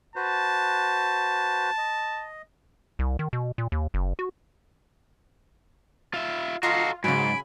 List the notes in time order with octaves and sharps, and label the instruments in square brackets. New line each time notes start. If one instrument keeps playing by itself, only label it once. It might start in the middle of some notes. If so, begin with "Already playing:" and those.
[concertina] F#4 B4 C5 [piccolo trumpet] A5
[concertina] D#5
[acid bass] C2
D#3
B2
A#2
D#2
F#1
F#4
[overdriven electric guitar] F4 E5
[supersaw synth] F4 [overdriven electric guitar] F#4 A4 [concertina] D#5 F5 A#5 [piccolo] C7
[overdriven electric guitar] G#2 [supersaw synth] C#3 F#3 [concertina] G#5 B5 [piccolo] D7